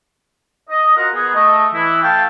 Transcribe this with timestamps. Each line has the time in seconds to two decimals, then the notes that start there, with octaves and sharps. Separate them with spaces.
0.70 D#5
0.96 F4 F#4 A#4 F#5 A#5
1.14 B3 G#4
1.35 A3 D#5
1.74 E3 E4
2.03 A3 F5 G5 A5